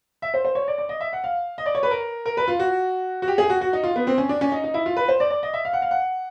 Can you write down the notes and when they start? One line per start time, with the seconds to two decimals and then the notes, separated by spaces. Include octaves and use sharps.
0.22 E5
0.34 C5
0.45 C5
0.55 C#5
0.68 D5
0.78 D5
0.89 D#5
1.00 E5
1.13 F#5
1.24 F5
1.58 D#5
1.66 D5
1.75 C#5
1.83 B4
1.91 A#4
2.25 A#4
2.37 B4
2.48 F4
2.59 F#4
3.22 F#4
3.28 G4
3.38 G#4
3.50 F#4
3.61 F#4
3.73 D#4
3.84 F4
3.96 B3
4.07 C4
4.18 C#4
4.29 D4
4.41 C#4
4.52 D#4
4.64 D#4
4.74 E4
4.86 F4
4.97 B4
5.08 C5
5.20 D5
5.30 D5
5.43 D#5
5.54 E5
5.65 F5
5.73 F#5
5.82 F5
5.91 F#5